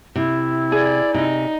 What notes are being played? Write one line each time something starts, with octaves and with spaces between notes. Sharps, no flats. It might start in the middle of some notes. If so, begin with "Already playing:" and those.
C3 E4
G#4 D5
C3 D#4